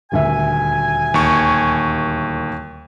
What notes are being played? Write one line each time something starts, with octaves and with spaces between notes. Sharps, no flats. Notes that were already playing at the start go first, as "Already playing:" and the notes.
D#1 D2 E5 G#5
D#2 C#6